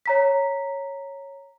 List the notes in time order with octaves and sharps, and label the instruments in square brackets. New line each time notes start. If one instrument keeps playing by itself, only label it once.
[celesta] C#5 A#5 B6